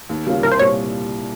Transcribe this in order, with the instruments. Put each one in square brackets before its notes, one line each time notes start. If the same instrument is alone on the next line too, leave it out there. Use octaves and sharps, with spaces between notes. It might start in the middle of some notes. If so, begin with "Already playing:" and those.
[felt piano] D#2
C#3 G3 A#3 F4
[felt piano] C2 [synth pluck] A#4
[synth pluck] C5
[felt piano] A#2 G3 [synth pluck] C#5